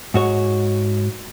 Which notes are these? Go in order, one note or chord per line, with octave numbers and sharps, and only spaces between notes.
G#2 F#4 C#5